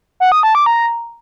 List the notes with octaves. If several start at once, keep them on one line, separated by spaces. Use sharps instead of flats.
F#5
D#6
A5
D6
A#5